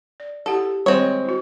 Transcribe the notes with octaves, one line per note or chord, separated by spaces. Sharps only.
D5
E4 G4 A4 F#5
D#3 G3 G#3 C4 C#5
E4 F#4